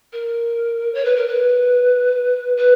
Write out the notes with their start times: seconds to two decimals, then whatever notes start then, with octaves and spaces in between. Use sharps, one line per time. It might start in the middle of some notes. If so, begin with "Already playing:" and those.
0.12 A#4
0.94 C#5
1.05 B4
1.16 A#4
1.27 B4
2.56 B4